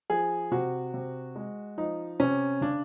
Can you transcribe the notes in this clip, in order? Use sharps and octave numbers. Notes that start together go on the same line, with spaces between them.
F3 G#4
C3 F#4
C3
G#3
F3 D#4
C3 C#4
C#3 D4